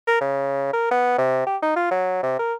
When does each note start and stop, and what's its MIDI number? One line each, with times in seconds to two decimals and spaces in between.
0.08 0.17 70
0.21 0.73 49
0.73 0.87 70
0.91 1.17 59
1.18 1.43 48
1.47 1.57 67
1.62 1.72 63
1.76 1.86 65
1.91 2.21 54
2.23 2.38 48
2.39 2.54 70